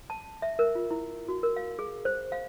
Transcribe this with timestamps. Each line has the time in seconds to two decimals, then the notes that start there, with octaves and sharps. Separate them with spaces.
0.10 A5
0.42 E5
0.59 A#4
0.75 F4
0.91 E4
1.29 F#4
1.43 A#4
1.56 F5
1.79 G#4
2.05 C5
2.32 F5